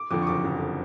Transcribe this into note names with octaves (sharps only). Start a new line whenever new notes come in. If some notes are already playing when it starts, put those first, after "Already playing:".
Already playing: D6
F2 D3 F3 D6
C#6
F#1 D6
F2 D3 F3